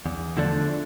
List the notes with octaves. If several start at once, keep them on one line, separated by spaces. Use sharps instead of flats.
E2
D3 F3 A3 D4